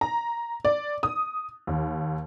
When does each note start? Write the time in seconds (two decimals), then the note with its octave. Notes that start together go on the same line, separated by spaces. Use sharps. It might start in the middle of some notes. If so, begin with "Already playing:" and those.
0.01 A#5
0.65 D5
1.03 D#6
1.67 D#2